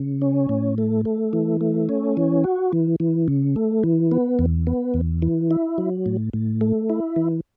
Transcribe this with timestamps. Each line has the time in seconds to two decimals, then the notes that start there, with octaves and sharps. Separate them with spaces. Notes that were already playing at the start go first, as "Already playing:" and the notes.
Already playing: C#3
0.22 C#4
0.49 A2
0.78 A3
1.05 A3
1.33 E3
1.61 A3
1.89 C#4
2.17 E3
2.44 F#4
2.73 E3
3.00 E3
3.28 C#3
3.56 A3
3.84 E3
4.11 B3
4.39 E2
4.67 B3
4.94 E2
5.22 E3
5.51 E4
5.78 F#3
6.06 A2
6.33 A2
6.61 A3
6.90 E4
7.16 E3